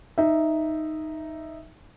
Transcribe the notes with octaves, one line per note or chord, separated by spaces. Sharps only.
D#4 E5